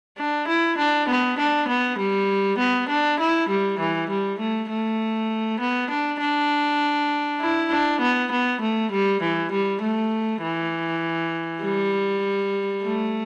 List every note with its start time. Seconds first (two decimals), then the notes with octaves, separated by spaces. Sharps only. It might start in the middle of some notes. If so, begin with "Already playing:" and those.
0.18 D4
0.48 E4
0.78 D4
1.09 B3
1.38 D4
1.68 B3
1.99 G3
2.58 B3
2.89 D4
3.19 E4
3.49 G3
3.79 E3
4.09 G3
4.39 A3
4.70 A3
5.60 B3
5.90 D4
6.21 D4
7.41 E4
7.71 D4
8.01 B3
8.32 B3
8.61 A3
8.92 G3
9.21 E3
9.52 G3
9.82 A3
10.43 E3
11.63 G3
12.83 A3